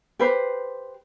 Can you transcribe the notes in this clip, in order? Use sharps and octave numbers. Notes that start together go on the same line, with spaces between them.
G4 B4 C5